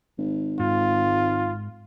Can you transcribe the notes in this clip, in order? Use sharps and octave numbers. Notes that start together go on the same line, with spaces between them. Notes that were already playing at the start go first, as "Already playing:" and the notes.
G#1
G#2 F4